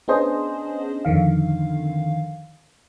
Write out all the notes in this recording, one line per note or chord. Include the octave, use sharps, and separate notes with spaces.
B3 C#4 D4 G#4 C5 D#5
F2 D3 D#3 F5